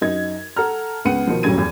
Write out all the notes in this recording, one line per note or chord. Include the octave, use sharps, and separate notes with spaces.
F#2 D#4 G#6
A4 F#5 A5 A#5 F6
C#2 B3 F#5 C#7 D#7
B2 D#3 F3
D#1 F#3 G3 C#4 G#6 D#7
E2